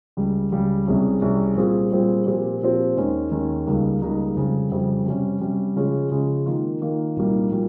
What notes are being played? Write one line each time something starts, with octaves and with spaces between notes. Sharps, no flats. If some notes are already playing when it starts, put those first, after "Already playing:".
C#2 C#3 G3
C#2 C#3 G3
C2 C3 G3 C#4 G#4
C2 C3 G3 C#4 G#4
A#2 G3 C4 F4 G#4
A#2 G3 C4 F4 G#4
A#2 F3 C4 G4
A#2 F3 C4 G4
D#2 D#3 G#3 C#4
D#2 D#3 G#3 C#4
C#2 C#3 G3 A#3 D#4
C#2 C#3 G3 A#3 D#4
F2 C#3 G3
F2 C#3 G3
C3 G3 C#4
C3 G3 C#4
C#3 F3 G#3 C#4 G#4
C#3 F3 G#3 C#4 G#4
D#3 A#3 F4
D#3 A#3 F4
C2 A#2 G3 A#3 D#4
A#2 G3 A#3